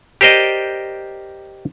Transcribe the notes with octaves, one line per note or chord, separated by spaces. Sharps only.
G4 A#4 C5 D5 D#5